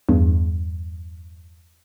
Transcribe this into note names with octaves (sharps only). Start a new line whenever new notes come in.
E2 G2